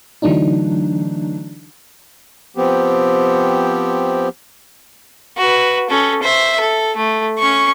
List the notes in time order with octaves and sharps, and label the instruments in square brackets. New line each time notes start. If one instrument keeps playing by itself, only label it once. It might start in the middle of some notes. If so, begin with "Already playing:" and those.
[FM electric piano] D3 E3 F#3 A3 D4 D#4
[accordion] F3 B3 C4 G4
[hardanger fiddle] F#4 B4
C#4 A4
C5 E5
A4
A3
C#4 C#6